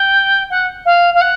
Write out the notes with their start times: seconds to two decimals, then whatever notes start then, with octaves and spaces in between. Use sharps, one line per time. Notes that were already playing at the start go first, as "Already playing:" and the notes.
Already playing: G5
0.50 F#5
0.85 F5
1.14 F5
1.21 F#5